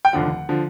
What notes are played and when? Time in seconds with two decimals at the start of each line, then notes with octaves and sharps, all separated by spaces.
0.05 G5
0.13 F1 D#2 D3 F3 F#5
0.49 D3 F3